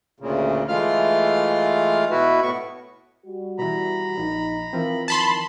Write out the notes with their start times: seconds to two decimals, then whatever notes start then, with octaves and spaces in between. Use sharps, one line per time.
0.20 D2 A#2 C#3
0.68 E3 G#3 A3 F4 F5 F6
2.11 B2 E4 F#4 B4
2.42 A2 B3 C#6
3.25 G3 F#4
3.58 B2 E3 A#5 B5
4.18 A#1 D#4
4.73 E3 F3 C4 E4 A#4
5.08 D#3 A5 B5 C6